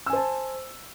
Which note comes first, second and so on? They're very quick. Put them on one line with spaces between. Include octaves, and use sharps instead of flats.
E6 G#5 C5 A5